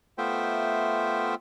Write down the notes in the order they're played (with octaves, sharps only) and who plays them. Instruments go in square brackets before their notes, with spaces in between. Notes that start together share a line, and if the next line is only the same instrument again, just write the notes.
[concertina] A3 B3 F4 C5 E5 G5